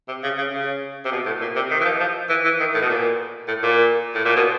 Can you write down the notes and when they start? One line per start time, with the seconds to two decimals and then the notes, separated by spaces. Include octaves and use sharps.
0.08 C3
0.23 C#3
0.38 C#3
0.53 C#3
1.05 C3
1.12 B2
1.26 A2
1.41 A#2
1.56 C3
1.71 D#3
1.80 E3
1.85 F3
2.00 F3
2.29 E3
2.45 E3
2.60 D#3
2.74 A2
2.82 B2
2.89 A#2
3.48 A2
3.63 A#2
4.15 A2
4.25 A#2
4.36 B2